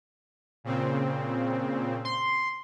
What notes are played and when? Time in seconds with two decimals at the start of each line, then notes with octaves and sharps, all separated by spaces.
0.64 A#2 C#3 C4
2.05 C6